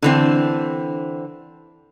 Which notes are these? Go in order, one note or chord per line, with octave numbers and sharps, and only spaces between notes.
D3 E3 C4